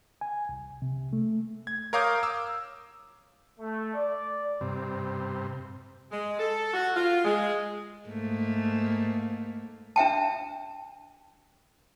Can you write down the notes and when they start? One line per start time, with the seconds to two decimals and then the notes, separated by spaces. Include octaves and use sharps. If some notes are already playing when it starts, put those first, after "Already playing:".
0.21 G#5
0.49 C2
0.82 C3
1.13 A3
1.67 G#6
1.93 A#4 C#5 F5 D6 D#6 G6
2.23 D6 E6
3.60 A3
3.94 D5
4.61 G2 C3
6.12 G#3
6.39 A4
6.74 F#4
6.95 F4
7.25 G#3
8.08 G#2 A3 A#3
9.96 D4 E5 G5 A5